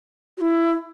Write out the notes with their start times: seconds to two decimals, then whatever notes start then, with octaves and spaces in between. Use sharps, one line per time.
0.37 F#4
0.41 E4